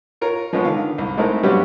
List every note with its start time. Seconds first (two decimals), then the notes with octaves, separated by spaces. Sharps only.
0.21 F4 A#4 C#5
0.53 F3 G#3 B3 C#4
0.65 D3 D#3 F5
0.98 C2
1.17 G#3 A3 C4 D#4 E4 A#4
1.43 G2 F#3 G3 B3 C#4 G4